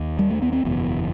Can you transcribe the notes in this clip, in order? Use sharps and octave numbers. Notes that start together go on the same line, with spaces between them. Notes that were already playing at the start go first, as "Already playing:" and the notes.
Already playing: D#2
G3
A3
B3
C4
F#1 E2 B2